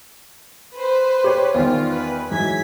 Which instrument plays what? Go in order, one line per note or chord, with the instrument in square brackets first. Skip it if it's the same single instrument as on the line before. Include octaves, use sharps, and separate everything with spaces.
[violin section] B4 C5
[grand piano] G4 C#5
[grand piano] E2 D#3 G3 [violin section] F4
[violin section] B4
[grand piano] G#2 E3 F#3 [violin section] G#6 B6